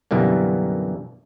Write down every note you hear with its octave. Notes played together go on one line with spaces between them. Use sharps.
F#2 B2 D3 E3 G3 A#3